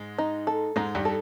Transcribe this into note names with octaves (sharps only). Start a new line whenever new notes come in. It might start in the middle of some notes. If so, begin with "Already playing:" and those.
Already playing: G#2 G#3
D#4
A4
G#2 G#3 D#4
G2 G3
A4